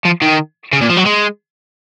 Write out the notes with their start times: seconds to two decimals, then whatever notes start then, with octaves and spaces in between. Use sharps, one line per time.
0.05 F3
0.22 D#3
0.73 C#3
0.81 A#2
0.90 F3
0.97 F#3
1.06 G#3